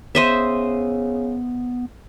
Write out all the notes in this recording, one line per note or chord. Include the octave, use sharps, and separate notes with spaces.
C#3 B3 C5 D#5 E5